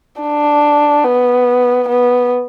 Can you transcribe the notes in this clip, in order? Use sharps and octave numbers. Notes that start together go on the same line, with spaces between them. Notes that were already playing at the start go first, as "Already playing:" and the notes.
D4
B3
B3